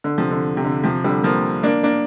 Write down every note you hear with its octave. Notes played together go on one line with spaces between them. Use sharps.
D3
C3 F3
D3
C3
D3
C3 F3
D3 G3
F3 A#3
A#3 D4
A#3 D4